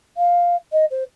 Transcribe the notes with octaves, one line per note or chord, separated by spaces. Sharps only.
F5
D#5
C5